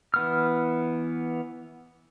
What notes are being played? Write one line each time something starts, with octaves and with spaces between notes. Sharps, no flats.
E3 B3 F6